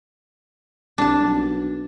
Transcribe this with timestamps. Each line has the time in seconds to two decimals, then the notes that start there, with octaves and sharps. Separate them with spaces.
0.98 C2 D4 A5
1.22 B1